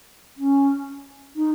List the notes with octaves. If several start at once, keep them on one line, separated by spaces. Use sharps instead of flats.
C#4
D#4